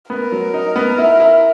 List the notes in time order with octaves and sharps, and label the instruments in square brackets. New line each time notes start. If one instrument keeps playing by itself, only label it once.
[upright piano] B3 [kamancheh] A#4
[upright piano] F#3
D#4
B3
E4
E4